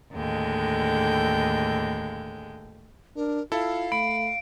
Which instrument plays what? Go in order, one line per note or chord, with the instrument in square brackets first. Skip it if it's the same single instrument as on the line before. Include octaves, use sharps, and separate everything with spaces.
[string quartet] D#2 A2 D3 G#3 G5
[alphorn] D4 [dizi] A#4
[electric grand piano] E4 A4 [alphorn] F4 [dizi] F5
[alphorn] A3 [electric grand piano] B5 [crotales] D7